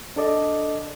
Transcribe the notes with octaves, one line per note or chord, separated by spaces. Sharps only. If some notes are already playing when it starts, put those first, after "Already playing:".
D4 A4 D5 D#5